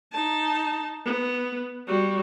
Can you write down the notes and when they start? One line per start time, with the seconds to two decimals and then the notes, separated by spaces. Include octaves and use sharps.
0.13 D#4 A5
1.05 B3
1.88 G3 F#4